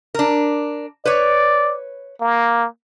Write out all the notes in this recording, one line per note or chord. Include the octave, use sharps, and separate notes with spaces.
D4 A#4
B4 C#5 D5
A#3